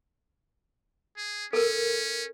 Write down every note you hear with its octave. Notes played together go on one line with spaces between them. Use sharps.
G#4
C#4 A4 A#4